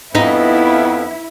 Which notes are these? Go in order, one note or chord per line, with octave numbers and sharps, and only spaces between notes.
F2 B3 D#4 E4